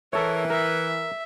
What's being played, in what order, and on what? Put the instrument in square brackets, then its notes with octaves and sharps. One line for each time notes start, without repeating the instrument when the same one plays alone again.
[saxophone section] E3 [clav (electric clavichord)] A4 C#5 [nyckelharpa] A#4
[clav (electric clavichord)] A#4 [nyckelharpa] E5